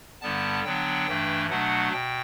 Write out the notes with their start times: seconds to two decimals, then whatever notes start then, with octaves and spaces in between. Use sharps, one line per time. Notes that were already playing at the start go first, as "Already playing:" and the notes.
0.21 G2 D3 G3 B3 A5
0.64 D3 F#3 B3 D4 G5
1.07 G2 E3 A3 D4
1.50 B2 F#3 A3 D4 F#5
1.92 B2 G5